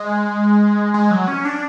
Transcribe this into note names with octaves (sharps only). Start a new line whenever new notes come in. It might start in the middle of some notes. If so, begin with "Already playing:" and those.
Already playing: G#3
G#3
F#3
C#4
D4